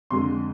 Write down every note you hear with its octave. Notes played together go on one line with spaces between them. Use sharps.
F2 D3 G#3 C6